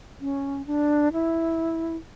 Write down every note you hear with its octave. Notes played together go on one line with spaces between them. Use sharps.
C#4
D4
E4